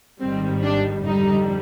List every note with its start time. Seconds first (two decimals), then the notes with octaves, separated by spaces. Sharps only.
0.20 G#1 G#2 D#3 G3 C4
0.63 D4
1.05 F2 D3 G3 D#4